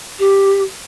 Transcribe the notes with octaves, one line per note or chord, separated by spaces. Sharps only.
G4